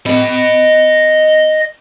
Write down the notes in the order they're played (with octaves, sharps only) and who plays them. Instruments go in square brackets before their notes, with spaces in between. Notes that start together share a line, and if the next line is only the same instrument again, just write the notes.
[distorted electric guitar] D#5 B5